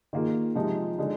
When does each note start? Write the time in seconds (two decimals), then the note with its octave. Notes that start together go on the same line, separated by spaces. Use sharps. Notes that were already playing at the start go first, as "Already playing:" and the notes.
0.13 D#3 A#3 F4 G#4
0.55 C3 F3 G#3 D#4
0.99 D3 G#3 D#4